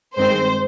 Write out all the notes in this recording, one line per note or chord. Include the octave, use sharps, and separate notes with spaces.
G2 D#3 G#3 C4 C5